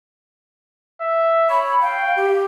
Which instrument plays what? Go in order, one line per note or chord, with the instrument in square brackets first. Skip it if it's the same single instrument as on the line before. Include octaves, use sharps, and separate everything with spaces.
[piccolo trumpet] E5
[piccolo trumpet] C#5 [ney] B5
[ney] F5 [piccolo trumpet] G5
[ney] G4